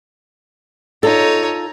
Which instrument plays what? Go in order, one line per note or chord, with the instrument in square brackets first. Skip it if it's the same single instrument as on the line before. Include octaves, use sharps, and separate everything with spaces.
[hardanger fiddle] D#4 C#5 [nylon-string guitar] F4 A4